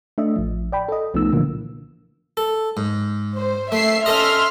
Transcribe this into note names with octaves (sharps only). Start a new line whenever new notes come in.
A3 D4 D#5 E5
A1 F3
D5 G5 B5
A4 D#5
C2 F3 A3 B3 D#4 E6
A#2 D3 E3 F3 A#3
A4
G#2
C5
A3 E5 C7
C#4 A4 D#5 E5 C6 F6